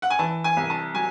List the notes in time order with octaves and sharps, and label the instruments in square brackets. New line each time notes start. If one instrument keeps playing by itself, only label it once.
[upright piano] F#5
G#5
E3 A5
G#5
C2
A5
F#3 G#5